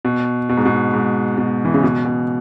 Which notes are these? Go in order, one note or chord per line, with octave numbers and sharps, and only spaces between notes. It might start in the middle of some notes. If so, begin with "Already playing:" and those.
B2
B2
G#2
B2
G#2
B2
E3
C#3
B2
B2